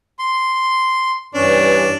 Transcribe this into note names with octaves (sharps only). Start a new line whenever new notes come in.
C6
G2 E3 C#4 D4